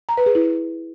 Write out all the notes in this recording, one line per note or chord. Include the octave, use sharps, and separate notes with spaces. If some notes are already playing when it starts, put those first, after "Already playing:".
A#5
B4
G#4
E4